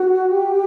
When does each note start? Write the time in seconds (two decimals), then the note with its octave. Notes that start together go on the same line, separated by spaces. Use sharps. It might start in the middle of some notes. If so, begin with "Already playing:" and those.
Already playing: F#4
0.31 G4